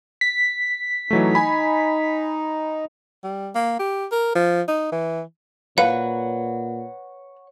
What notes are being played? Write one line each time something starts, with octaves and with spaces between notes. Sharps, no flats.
B6
E3 F#3 A3 D#4
G#5 B5
G3
A#3
G4
A#4
F3
D#4
E3
A#2 B4 C#5 F5 F#5